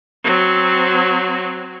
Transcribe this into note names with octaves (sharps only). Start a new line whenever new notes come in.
F#3 C4